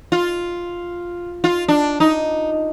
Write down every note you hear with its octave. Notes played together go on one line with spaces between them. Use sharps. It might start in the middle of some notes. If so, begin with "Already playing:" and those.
F4
F4
D4
D#4